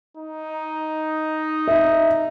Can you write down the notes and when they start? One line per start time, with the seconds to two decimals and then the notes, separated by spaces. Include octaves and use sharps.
0.17 D#4
1.68 E5